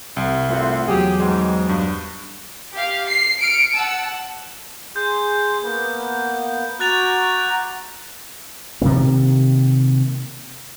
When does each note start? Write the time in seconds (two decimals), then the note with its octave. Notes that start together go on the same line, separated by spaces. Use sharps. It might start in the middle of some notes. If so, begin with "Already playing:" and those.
0.17 C2
0.49 G2 A3 C4 F4 F#5
0.88 E2 F#3 G4 G#4 D#6
1.20 G#2 B2 G3 G#3
1.69 G2
2.73 G4 F5
3.07 C7
3.39 F6 C#7 D7
3.73 F#5 A5 E6
4.96 G#4 C6 G6
5.63 A#3 B3
6.80 F#4 A#5 D6 F#6 A6 F7
8.82 C3 D#3 A#3